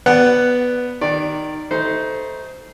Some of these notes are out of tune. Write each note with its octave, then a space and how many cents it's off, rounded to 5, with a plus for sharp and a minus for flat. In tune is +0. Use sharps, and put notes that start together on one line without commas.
B3 +0 D5 +0 F#5 +0
D#3 -15 D5 +0
A3 +0 D#4 +20 C5 -15